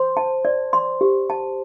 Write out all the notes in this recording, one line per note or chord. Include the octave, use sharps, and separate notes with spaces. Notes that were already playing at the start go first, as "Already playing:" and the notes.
Already playing: C5 C6
A5
D5
C6
G4
A5